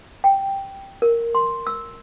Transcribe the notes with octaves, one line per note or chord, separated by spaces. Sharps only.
G5
A#4
C6
E6